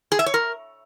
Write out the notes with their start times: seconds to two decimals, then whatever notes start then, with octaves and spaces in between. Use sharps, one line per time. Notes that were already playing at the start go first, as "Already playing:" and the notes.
0.12 G#4
0.19 E5
0.26 C#5
0.34 A#4